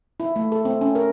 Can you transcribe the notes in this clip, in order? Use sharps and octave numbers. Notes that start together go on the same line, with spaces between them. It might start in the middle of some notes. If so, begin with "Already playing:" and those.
E4
A3
A4
C4
C#4
A#4